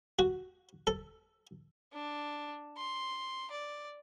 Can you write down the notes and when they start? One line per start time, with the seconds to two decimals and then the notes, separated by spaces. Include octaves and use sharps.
0.19 F#4
0.87 A4
1.93 D4
2.77 C6
3.51 D5